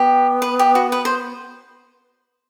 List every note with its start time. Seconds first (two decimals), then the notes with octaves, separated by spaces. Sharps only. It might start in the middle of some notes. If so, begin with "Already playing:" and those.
Already playing: B3 G4
0.42 B4
0.59 G4
0.75 F#4
0.92 B4
1.05 C5